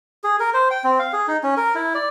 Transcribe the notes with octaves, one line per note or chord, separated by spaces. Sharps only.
G#4
A#4
C5
G5
C4
F5
G#4
D#4
C#4
A#4
E4
D5